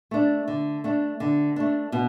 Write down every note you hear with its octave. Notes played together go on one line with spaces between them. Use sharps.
A3 D4
D3
A3 D4
D3
A3 D4
B2